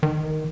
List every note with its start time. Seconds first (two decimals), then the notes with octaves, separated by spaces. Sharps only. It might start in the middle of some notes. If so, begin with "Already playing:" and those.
0.03 D#3